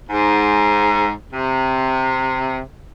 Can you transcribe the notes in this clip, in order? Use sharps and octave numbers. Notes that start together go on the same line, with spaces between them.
G#2
C3